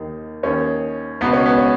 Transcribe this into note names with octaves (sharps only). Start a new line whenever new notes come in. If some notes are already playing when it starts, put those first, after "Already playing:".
Already playing: D#2 D#3
D#2 D#3 C#4
C#2 B2 B3
C#4
B3
C#4